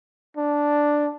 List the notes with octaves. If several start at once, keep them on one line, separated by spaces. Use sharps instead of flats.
D4